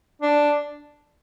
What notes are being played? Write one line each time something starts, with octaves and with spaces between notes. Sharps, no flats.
D4